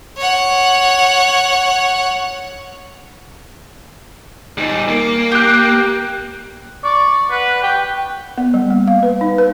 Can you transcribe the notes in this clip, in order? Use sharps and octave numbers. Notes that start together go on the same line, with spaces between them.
C#5 F#5
G3 D#4
A#3
G4 F#6
D5 C#6
B4 F#5
G5
B3
G3
A#3
F5
B4
D#4
B4